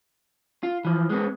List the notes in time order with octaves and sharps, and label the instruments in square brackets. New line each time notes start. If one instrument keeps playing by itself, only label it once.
[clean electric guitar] F4
E3 F3
G#3 B3 C4